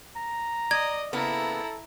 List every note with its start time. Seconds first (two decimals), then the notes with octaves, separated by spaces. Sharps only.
0.16 A#5
0.71 D5 D#5 G#6
1.13 C#3 A#3 B3 E4 A4 A#5